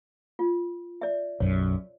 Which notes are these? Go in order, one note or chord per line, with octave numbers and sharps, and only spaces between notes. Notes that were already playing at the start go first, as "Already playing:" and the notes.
F4
D5 E5
B1 F#2 C#5